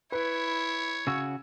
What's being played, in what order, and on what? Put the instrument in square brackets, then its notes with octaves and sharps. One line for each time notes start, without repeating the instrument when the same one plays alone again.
[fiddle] E4 [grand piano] B4 [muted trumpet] C#5
[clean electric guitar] C#3 F#4 [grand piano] E6